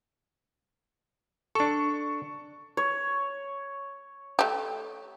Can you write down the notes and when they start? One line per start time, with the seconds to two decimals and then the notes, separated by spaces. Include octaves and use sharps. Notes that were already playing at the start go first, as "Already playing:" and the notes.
1.55 D4 A4 C#6
2.77 C#5
4.39 A3 G4